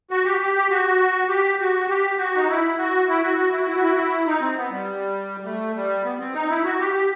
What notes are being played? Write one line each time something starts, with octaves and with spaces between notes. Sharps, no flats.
F#4
G4
G4
G4
F#4
G4
F#4
G4
F#4
D#4
E4
F#4
E4
F#4
F#4
E4
F#4
E4
F#4
E4
F#4
E4
D#4
C4
B3
G3
G3
A3
G3
B3
C4
D#4
E4
F#4
G4
G4